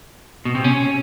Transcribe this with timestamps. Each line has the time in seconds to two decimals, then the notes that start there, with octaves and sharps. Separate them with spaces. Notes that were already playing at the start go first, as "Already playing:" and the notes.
0.45 B2
0.55 C3
0.64 C#4